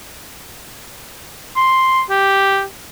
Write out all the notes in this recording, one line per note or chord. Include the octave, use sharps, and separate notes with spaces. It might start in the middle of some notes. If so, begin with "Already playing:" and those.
C6
G4